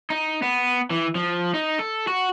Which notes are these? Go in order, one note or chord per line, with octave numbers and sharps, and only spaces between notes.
D#4
B3
E3
F3
D#4
A4
F#4